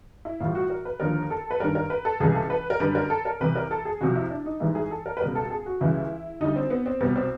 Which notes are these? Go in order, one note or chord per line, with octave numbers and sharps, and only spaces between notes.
E4
A2 E3 G3 F4
F#4
A#4
B4
D#2 D3 F3 A#4
A4
B4
G2 D#3 G3 A#4
A#4
B4
A4
C#2 C3 E3 G3 G#4
A4
B4
A#4
F#2 D3 G3 B4
A#4
A4
A#4
C2 C3 E3 B4
A#4
A4
G#4
C2 C3 F3 F#4
E4
D4
D#4
G#2 E3 G3 E4
G#4
A4
A#4
B4
C#2 B2 G3 A#4
A4
G#4
F#4
C#2 C#3 E3 G3 E4
D2 D3 G3 D#4
C4
B3
C4
C2 B2 G3 B3
C4